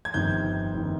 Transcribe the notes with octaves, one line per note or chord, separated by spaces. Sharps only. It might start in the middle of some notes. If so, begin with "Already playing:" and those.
G#6
G1 F2 D#3 G6
G1 D#3